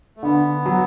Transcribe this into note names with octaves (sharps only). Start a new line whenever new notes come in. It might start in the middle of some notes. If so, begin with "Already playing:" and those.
A3
D3 B3
F#3